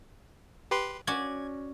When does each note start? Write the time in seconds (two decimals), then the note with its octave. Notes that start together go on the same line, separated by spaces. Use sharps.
0.71 G4 B4 C6
1.07 C#4 F#4 D5 G#6